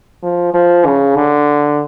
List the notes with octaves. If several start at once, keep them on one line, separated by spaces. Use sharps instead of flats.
F3
F3
C#3
D3